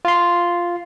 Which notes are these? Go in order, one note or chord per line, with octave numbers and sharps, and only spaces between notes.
F4 C6